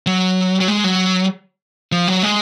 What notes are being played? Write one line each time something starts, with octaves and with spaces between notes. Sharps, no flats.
F#3
F#3
G#3
F#3
F3
F#3
G#3